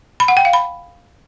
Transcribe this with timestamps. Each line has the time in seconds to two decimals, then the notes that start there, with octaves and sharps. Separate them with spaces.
0.20 B5
0.28 F#5
0.37 G5
0.45 F5
0.53 B5